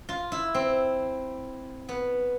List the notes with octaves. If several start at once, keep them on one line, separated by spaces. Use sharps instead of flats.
F4
E4
C4
B3